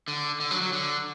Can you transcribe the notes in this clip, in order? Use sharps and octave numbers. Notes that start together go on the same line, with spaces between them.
D3
D3
F#3
F#3
D3